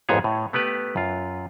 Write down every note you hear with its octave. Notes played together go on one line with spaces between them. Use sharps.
A1 F2 G#2 B3 G#4 C#5
A2
A3 B3 G4 B4
F#2 F4